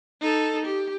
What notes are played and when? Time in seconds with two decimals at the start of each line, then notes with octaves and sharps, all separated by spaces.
0.21 D#4 A4
0.65 G4